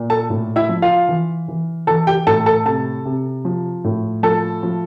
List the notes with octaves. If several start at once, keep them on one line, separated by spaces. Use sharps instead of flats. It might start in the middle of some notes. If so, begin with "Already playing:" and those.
Already playing: A#2
A4 A5
A2
E4 E5
F3
F4 F5
E3
E3
E3 A4 A5
G4 G5
A2 A4 A5
A4 A5
C3 A4 A5
C3
F3
A2
F3 A4 A5
F3